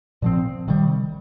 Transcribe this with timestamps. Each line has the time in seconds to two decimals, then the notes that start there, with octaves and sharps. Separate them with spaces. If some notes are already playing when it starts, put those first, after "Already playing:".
0.22 A#2 F3 C4
0.68 C3 D#3 G3